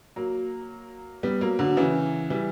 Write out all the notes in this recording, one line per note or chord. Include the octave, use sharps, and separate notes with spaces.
F#3 A#3
G3 B3
F#3 A#3
D3 F#3
C#3 E3
E3 G3